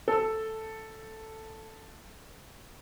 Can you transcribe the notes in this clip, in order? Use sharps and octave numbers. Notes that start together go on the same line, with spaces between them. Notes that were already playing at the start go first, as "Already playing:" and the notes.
A4 E6